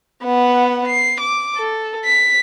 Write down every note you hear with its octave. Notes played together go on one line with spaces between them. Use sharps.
B3 F#5
C7
D6
A4
B6